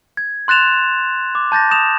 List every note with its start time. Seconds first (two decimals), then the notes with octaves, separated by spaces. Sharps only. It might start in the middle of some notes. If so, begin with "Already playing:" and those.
0.17 G#6
0.48 C6 F#6 A6 E7 F7
1.35 D6
1.52 A5 G6 A6 A#6
1.71 D#6 E7 F7